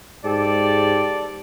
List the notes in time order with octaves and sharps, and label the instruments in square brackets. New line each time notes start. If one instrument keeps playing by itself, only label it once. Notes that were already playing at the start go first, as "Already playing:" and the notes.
[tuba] G#2 [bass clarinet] G4 [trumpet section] A4 D5